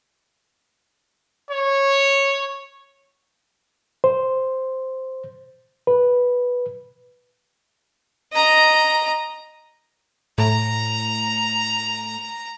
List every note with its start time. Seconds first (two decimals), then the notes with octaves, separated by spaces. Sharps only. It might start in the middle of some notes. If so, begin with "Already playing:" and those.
1.51 C#5
4.04 C5
5.87 B4
8.33 D#5 A#5
10.38 A2 A#5